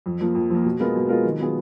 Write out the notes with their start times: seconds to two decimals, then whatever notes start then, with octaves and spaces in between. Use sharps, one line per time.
0.06 F2
0.21 F3 A#3
0.35 F2
0.50 F3 A#3
0.65 B2
0.80 G#3 B3 F4 A#4
0.95 B2
1.09 G#3 B3 F4 A#4
1.25 D#3
1.39 F#3 B3 F4 G#4